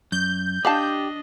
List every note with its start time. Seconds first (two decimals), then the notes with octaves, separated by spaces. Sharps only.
0.12 F#2 G6
0.65 D4 G4 D5 D#5 F5 A5